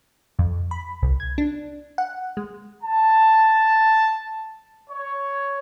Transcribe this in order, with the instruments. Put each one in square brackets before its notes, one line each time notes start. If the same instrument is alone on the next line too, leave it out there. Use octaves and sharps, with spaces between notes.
[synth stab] F2
B5
C2
G#6
D4
F#5
G#3
[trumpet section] A5
C#5